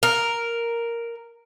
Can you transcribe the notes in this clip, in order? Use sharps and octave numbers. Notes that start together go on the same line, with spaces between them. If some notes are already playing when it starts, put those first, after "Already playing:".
A#4